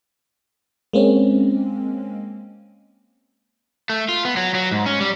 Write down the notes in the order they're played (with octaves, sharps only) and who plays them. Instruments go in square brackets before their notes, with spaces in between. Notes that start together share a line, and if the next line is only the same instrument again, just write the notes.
[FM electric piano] G#3 A#3 C4 C#4
[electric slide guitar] A3
F4
B3
F#3
F#3
G#2
C#4
G3